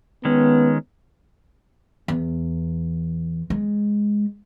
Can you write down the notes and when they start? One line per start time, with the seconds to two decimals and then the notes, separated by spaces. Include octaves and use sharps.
0.25 D#3 G#3 B3 C#4
2.08 E2
3.50 G#3